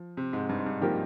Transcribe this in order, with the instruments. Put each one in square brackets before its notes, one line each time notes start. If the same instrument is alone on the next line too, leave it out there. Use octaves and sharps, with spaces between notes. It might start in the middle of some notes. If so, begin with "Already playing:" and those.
Already playing: [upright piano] F3
[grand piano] C3
G#2
G2
G#2
G2
[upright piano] F3 A#3 D#4 G4 A#4